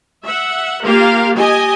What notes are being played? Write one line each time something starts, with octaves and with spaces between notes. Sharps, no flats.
E5 F#5
A#3 F4 G4 A#4 F5
G4 D#5 G#5